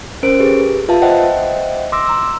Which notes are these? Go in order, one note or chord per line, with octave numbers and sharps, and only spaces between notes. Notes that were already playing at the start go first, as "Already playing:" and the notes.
C#4 A#4 C5 D7
G4 G#4 B4
F4 B4 E5 F5 A5
C5 D#5 E5 F#5 G5
C6 D6 E6 A#6
A#5 E6